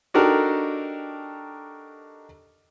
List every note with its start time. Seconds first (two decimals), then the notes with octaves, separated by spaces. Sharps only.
0.14 D4 D#4 F#4 G4 A4 A#4